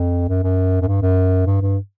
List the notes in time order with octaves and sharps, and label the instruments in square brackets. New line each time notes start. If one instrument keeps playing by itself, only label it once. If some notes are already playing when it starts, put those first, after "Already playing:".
Already playing: [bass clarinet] F2
F#2
F#2
F#2
G2
F#2
G2
G2